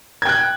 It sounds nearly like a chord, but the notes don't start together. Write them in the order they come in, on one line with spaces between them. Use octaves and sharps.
G#6 G5 F#6